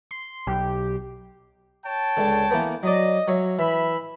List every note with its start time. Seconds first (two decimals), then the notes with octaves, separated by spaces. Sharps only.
0.11 C6
0.47 B1 G4
1.85 C#5 G5 A5
2.17 C#2 D3
2.51 E3 A#3 B3
2.83 F#3 D5 D#5
3.28 F#3 C#5 E5
3.59 E3 E5 B5